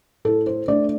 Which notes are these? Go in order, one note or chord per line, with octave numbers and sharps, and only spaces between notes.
A2 A4
C5
A3 D4 D5